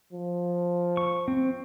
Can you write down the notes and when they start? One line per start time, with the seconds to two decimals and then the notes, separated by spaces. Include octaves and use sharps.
0.13 F3
0.97 C#6
1.28 C4